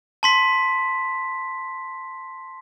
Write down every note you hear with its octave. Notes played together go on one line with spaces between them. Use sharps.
A5 C6 B6